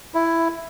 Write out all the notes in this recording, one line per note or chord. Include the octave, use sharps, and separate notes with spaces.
E4